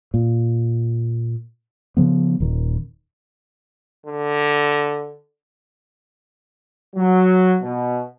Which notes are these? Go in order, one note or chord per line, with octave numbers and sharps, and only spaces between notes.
A#2
C#3 F3 B3
D#1 D#3
D3
F#3
B2